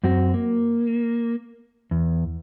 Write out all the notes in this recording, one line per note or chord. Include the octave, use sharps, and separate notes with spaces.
F#2 C4 F#4
A#3
E2